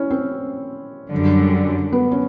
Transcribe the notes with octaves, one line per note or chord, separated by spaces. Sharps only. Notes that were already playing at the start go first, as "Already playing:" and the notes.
Already playing: C#4 E4
C4
F#2 D3 G3
B3
C#4